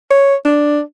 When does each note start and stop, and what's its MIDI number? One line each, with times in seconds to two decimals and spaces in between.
0.10 0.35 73
0.45 0.81 62